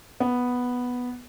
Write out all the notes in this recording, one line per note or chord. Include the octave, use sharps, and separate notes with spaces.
B3